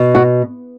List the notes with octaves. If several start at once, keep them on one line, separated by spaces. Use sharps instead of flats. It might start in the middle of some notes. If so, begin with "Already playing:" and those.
Already playing: B2
F#4